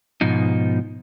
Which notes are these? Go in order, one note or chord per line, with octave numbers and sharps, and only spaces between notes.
G#2 B2 F3 D#4